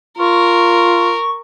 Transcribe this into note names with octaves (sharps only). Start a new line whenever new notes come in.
F4 A#4 C#6